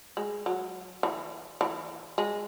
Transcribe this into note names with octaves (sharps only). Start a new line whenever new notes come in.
G#3
F#3
E3
E3
G#3